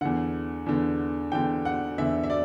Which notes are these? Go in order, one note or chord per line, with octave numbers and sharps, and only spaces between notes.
E2 D3 F#5
E2 D3
E2 D3 G5
F#5
E2 D3 E5
E5
D5